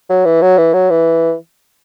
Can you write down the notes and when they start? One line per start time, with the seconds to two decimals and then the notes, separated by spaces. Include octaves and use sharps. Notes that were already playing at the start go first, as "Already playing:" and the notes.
0.09 F#3
0.25 E3
0.42 F#3
0.58 E3
0.74 F#3
0.90 E3